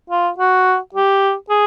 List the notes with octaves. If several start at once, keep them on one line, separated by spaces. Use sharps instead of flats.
F4
F#4
G4
G#4